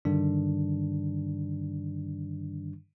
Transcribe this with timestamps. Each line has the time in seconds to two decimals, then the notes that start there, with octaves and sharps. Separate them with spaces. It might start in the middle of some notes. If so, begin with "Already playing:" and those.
0.05 G2 D3 D#3 G3 D4